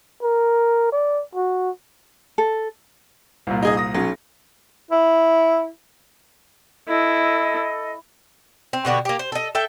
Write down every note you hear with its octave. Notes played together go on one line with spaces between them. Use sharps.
A#4
D5
F#4
A4
C2 A#2
D#4 G#4 D#5
D#6 A#6
B1 F#3 C#4
E4
E4 A4 D#5
C4
B2 D3 F#4 G4
A#3 G4
C5
A4 D#5
A4 E5 G5